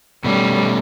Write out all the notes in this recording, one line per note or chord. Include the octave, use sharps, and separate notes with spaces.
B2 G3 A3 C#4